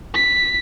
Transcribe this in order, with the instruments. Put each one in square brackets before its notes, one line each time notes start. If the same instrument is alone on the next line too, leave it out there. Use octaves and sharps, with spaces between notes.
[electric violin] B6